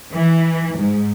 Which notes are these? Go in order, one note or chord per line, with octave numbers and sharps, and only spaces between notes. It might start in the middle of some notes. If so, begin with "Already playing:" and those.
E3
G#2